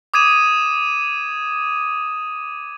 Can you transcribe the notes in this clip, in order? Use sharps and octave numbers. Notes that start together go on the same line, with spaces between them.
D6 D#6 G#6 D#7 E7